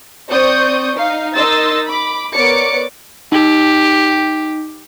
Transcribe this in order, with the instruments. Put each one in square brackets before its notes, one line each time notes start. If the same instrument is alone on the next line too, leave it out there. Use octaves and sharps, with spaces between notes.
[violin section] C4 C5 D5 C#6 D#6 G6
D#4 F5
D#4 A#4 D#5 C6 E6 A6
B5 D6
B3 A#4 C#5 D5 D6 C#7
[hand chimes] D#4 [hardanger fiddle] G4